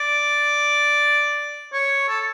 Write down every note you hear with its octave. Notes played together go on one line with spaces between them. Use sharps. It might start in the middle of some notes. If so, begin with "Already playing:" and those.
Already playing: D5
C#5
A4